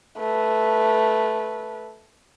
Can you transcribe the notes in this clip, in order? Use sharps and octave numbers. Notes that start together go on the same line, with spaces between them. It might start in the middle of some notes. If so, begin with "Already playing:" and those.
A3 B4